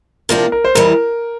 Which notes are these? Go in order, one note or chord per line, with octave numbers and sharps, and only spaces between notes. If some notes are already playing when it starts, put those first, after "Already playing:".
C3 F3 A#3 D4 A#4
A#4
C5
F2 E3 G3 A#4